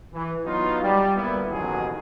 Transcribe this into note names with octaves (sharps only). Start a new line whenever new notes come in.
E3
F#3 B3 D#4 F4
G3
D2 A#3 B3 E4
A1 D#2 B2 F#3 G#4